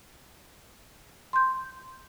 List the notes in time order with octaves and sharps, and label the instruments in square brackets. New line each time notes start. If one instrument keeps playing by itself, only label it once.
[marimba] C6 G6